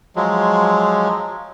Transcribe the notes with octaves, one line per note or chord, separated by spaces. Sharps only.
F3 F#3 G#3